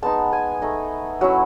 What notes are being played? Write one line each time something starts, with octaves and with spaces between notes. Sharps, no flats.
G#3 B3 D#4 A5
G#5
A3 D#4
F#3 C#4 E4